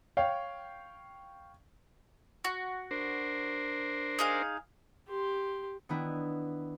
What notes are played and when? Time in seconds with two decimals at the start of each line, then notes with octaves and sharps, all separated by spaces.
0.17 C#5 F5 G5
2.45 F#4
2.91 D4 A#4 C5
4.19 D#4 G#4 F5
5.08 G4 C6
5.89 D#3 B3 D4 E4